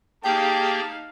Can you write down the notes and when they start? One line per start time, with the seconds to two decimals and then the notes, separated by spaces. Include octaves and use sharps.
0.24 A#3 D#4 G4 G#4 F5 G5 A5